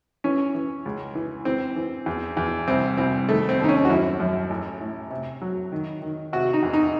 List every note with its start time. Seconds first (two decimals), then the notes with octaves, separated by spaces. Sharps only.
0.24 E3 C#4
0.55 E3
0.85 C#2
1.15 E3
1.45 E3 C4
1.76 E3
2.06 E2
2.37 E2
2.68 C2 C4
2.97 C2 C4
3.28 D#3 A3
3.49 C4
3.59 D#2
3.64 D#4
3.69 C#4
3.85 F#4
3.89 F#2 E4
4.20 F#2
4.50 A1
4.81 A2
5.10 C3
5.42 F#3
5.72 D#3
6.02 D#3
6.33 C3 F#4
6.53 D#4
6.63 E2
6.73 D#4